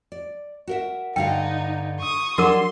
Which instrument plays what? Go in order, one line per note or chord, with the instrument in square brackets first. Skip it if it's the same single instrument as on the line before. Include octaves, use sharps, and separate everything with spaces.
[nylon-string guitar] D5
F#4 A#4 E5
[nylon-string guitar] G2 D3 F5 [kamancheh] D#4 [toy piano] G5
[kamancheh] C#6 D#6
[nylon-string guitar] F#3 G3 D4 [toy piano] F#4 A#4 D6 [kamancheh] C6